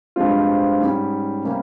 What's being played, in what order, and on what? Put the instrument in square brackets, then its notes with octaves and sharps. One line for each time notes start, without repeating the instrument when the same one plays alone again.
[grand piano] G2 F3 G#3 C4 F4
G#2 G3 C#4
C3 G3 A#3 C#4